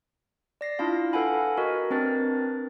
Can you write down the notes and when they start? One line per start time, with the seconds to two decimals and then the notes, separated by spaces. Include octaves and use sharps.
0.61 D5 A#6 C7
0.79 D4 E4 F4 F5
1.13 A4 B4 F5 F#5 G#5 B5
1.58 F#4 A#4 D#5
1.91 C4 D4 A#4 B4 A6